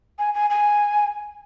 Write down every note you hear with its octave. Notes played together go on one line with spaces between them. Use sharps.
G#5
G#5
G#5